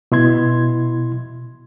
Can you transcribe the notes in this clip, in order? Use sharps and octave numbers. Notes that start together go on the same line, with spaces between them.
B2 E4 C6 G#6